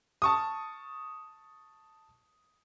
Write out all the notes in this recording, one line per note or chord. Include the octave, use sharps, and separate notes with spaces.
A5 C#6 D#6